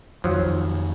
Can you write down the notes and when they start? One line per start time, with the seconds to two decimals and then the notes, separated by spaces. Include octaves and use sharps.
0.24 F2 D#3 F3 F#3